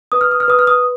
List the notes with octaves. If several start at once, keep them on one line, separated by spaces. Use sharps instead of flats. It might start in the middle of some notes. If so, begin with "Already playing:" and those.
B4 D#6
F6
D#6
F6
B4 D#6
F6
D#6